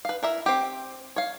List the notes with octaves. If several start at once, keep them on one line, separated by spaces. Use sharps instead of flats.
B4 F5
E4 A#4 E5
C4 G4
C#5 F5